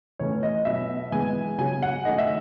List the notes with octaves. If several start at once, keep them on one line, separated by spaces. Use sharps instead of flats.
A2 E3 A3 C#4 C#5
D#5
B2 F#3 B3 E5
E3 G#3 B3 G#5
C#3 F#3 C#4 G#5
F#5
D#3 A3 C#4 D#5
E5